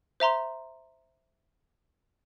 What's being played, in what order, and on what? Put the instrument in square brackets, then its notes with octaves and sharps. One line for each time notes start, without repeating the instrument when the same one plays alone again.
[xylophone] C5 E5 A#5 C6